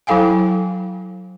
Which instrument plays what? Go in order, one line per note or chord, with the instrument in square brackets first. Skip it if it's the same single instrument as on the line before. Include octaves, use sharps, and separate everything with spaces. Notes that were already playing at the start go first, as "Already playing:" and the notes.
[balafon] F#3 E4 A4 F5 G5 G#5